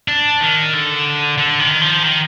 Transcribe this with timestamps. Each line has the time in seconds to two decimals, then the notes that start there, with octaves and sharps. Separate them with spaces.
0.08 D4
0.41 D#3
0.73 D3
1.38 D3
1.59 D#3
1.81 F3
2.03 D#3